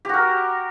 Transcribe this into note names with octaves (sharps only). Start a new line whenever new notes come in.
F#4 G4 A#4